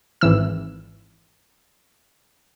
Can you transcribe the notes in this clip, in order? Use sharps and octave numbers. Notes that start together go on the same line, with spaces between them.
G#1 E3 E6